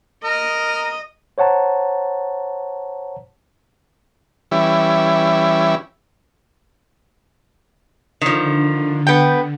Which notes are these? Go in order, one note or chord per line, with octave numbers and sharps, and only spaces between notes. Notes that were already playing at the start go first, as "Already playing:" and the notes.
A#4 D#5
C5 C#5 F#5 A5 A#5
E3 G3 C#4 E4
D3 D#3 F3
B3 G5